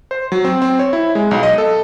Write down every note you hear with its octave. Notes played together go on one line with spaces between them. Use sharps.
C5
F#3
C4
C4
C#5
E4
G#3
B1
D#5
A4